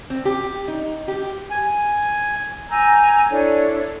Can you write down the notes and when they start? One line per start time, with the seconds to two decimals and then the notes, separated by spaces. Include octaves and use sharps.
0.10 C4
0.25 G4
0.68 D#4
1.08 G4
1.51 G#5
2.70 G#5 A#5 E6 G6
3.31 D4 E4 A4 C#5